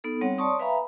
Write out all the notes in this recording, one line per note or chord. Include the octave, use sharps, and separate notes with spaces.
B3 D#4 A4
G3 C4 C#5 F#5
C#5 D5 A5 C6 C#6 D#6
B4 E5 F5 G#5 A#5 B5